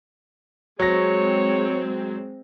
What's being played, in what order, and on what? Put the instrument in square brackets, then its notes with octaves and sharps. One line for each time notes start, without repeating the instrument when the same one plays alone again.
[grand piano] F#3 A#6 [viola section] G#3 C4 [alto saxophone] C#5